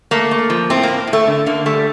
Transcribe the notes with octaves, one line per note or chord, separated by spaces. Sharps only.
A3 A#3
A3
F3
A2 C4
A#3
A2
A2
A3
D3
D3 A#3
G3 A3